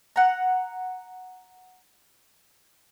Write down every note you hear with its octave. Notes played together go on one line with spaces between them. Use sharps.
F#5 A#5